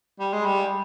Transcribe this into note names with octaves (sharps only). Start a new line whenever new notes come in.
G3
G#3
G3